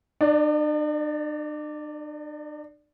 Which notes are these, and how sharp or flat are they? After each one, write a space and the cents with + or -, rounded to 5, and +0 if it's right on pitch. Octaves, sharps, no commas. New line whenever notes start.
D4 +45 D5 +0